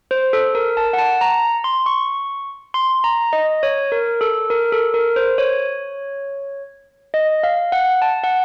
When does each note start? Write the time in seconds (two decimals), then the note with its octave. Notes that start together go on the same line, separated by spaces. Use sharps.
0.11 C5
0.33 A4
0.55 A#4
0.77 A5
0.93 F#5
0.98 A5
1.21 A#5
1.64 C6
1.86 C#6
2.74 C6
3.04 A#5
3.33 D#5
3.63 C#5
3.92 A#4
4.21 A4
4.50 A#4
4.72 A4
4.94 A#4
5.16 C5
5.38 C#5
7.14 D#5
7.43 F5
7.72 F#5
8.02 A5
8.24 F#5